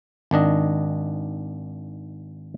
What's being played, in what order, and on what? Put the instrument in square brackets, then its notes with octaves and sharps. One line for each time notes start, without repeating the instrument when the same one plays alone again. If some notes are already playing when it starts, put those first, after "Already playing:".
[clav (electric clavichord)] G#1 D#3 D4 D#5